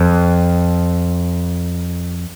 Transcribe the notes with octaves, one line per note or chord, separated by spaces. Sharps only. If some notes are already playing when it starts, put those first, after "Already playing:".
Already playing: F2